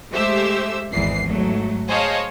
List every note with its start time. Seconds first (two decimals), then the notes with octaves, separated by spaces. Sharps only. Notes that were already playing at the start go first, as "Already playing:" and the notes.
0.12 G#3 A3 G4 C5 E5 E6
0.92 G#1 E2 G#2 E3 C7
1.28 G#2 F#3 A3
1.88 G#4 C5 C#5 D#5 F5 A5